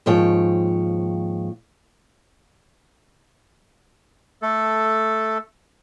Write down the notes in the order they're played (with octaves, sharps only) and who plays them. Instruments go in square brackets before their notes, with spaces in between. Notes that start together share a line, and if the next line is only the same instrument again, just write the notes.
[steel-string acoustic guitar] D#2 G#2 F3 C#5 G5
[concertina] A3 A4